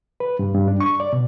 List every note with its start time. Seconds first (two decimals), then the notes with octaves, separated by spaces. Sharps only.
0.20 B4
0.39 G2
0.55 G2
0.68 D4
0.81 C#6
1.00 D5
1.13 B2